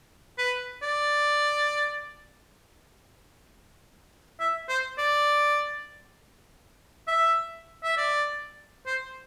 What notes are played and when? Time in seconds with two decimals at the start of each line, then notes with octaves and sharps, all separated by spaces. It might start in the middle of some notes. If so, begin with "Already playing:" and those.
0.38 B4
0.82 D5
4.40 E5
4.69 C5
4.98 D5
7.08 E5
7.84 E5
7.97 D5
8.86 C5